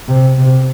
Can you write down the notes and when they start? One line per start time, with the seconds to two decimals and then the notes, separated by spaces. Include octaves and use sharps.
0.08 C3
0.39 C3